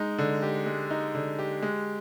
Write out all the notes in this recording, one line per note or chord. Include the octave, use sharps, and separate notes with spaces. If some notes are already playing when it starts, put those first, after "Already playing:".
Already playing: G#3 D#4
D3
G4
G#3
D#4
D3
G4
G#3